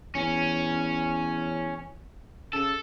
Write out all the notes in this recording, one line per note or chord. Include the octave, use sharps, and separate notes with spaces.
E2 C#4
C#3 A4